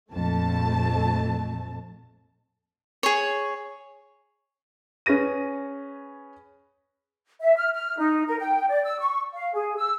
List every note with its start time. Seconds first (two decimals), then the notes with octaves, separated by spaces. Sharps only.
0.11 A#1 F2 A3 A5
3.03 G#4 C#5
5.06 C#4 G#4 B4 A#6 D#7
7.41 E5
7.57 F6
7.74 F6
7.98 D#4
8.27 A#4
8.40 G5
8.69 D5
8.85 E6
8.99 C#6
9.34 F5
9.54 G#4
9.77 E6